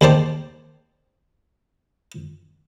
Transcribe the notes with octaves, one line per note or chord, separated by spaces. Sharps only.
D#2 D#3 C4 C5 D5 A5